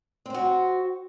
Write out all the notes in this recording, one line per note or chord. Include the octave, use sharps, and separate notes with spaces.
C4 F#4 C5